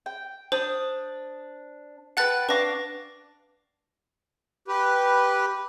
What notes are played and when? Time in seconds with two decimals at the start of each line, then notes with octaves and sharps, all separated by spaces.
0.06 G5
0.52 D4 C5 D#6
2.17 B4 F#5 G5 A5 F#6 A6
2.49 D4 B4 F5 C#6 D6 A#6
4.68 G4 B4